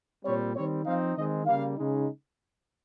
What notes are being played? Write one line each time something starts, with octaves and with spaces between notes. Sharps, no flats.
A#2 G3 C4 C#5
D#3 G3 C4 C#5
F3 C4 D#4 F5
D#3 G#3 C4 D#4 D#5
C#3 G3 A#3 F5
C#3 G#3 D#4